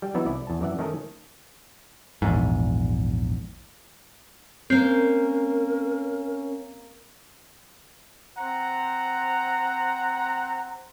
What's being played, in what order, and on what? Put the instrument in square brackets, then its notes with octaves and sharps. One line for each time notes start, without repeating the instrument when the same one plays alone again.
[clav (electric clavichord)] G3 G5
E3 F#3 B3 D#4 E4 E5
C2 E4 D5
E2 A5
F#2 E3 D5 E5 F#5
D#3 A3 C#4 A4 A#4 D#5
[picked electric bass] A#1 E2 G#2
[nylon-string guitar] A#3 C5 [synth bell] C4 [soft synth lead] C#4 [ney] A#4
[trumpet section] C4 C5 F#5 A#5